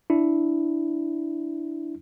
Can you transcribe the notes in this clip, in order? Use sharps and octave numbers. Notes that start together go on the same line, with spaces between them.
D4 E4